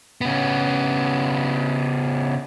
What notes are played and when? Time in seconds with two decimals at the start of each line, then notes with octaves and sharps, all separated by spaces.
0.21 C#3 B3